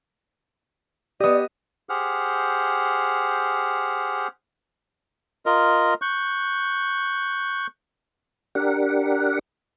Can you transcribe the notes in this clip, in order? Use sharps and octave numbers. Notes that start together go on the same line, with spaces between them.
B3 G4 D5 D#5 D#6
G4 G#4 C5 F#5 F6
F4 A#4 D#5
C#6 F#6 G6
D4 G4 A#4 F#5